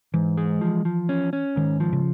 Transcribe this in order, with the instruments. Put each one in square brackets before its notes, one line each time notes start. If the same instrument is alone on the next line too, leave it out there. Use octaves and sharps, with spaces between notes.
[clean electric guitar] G#2 [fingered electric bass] E3
[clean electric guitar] G#3
F3
F3
C#4
C#4
[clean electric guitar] G#2 [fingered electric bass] D#3
[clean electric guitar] F3
[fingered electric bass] C#3